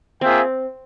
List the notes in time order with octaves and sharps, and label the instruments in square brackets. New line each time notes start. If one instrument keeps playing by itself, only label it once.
[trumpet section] A#3 F4 G#4 E5 G5 [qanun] C4